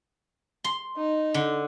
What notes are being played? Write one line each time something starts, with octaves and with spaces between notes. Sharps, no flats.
C6
D#4
D3